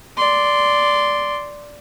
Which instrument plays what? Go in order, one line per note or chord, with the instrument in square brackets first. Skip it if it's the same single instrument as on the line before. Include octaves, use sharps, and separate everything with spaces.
[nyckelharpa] D5 C6